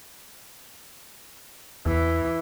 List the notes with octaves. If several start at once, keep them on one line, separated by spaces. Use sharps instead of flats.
E2 E3